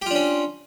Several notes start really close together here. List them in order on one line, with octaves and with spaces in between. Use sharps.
G4 F4 D4 C#4